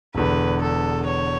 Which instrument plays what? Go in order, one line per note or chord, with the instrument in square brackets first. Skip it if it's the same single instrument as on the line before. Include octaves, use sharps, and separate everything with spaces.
[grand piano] E1 E2 D3 [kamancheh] B4
[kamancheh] A4
C#5